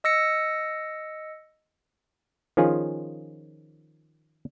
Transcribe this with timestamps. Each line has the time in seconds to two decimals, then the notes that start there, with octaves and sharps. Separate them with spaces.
0.04 D#5 E6 A#6 C#7
2.57 D#3 F3 C#4 F4 G#4